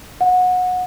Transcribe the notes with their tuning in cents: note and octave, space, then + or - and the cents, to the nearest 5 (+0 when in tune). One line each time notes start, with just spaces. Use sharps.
F#5 -20